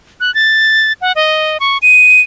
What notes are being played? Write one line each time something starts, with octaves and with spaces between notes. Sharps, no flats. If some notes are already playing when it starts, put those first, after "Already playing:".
F#6
A6
F#5
D#5
C#6
D#7